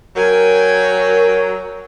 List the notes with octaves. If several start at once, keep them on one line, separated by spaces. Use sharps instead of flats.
F#3 A#4 G5 G#5